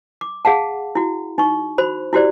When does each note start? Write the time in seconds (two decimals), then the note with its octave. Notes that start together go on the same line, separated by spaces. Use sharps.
0.21 D6
0.45 G#4 F5 F#5 A5
0.95 E4 F#4
1.38 D#4 C#6
1.78 F#4 C5 B5
2.13 E4 F#4 G4 C5 D5